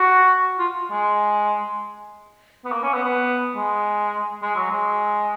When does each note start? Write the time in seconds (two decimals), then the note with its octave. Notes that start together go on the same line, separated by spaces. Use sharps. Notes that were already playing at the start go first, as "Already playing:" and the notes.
Already playing: F#4
0.59 F4
0.91 G#3
2.65 B3
2.72 A#3
2.83 C#4
2.93 B3
3.04 B3
3.57 G#3
4.42 G#3
4.56 F#3
4.70 G#3